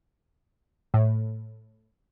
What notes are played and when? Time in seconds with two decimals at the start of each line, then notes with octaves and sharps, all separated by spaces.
0.94 A2